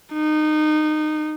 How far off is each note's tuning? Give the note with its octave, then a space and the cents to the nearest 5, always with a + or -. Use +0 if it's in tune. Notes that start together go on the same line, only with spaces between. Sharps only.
D#4 -25